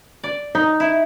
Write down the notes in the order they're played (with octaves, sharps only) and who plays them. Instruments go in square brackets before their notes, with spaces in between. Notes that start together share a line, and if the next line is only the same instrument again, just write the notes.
[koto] D5
[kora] D#4
[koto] E4